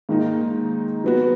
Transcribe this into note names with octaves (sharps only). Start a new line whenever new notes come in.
G#2 D#3 A#3 D#4
F#3 B3 F#4